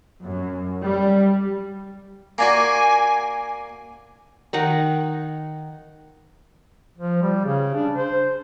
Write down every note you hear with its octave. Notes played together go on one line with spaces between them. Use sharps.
F#2
G3
A#3 D4 F#4 G#5
D#3 D#4 F#5
F3
G3
C#3
D4
C5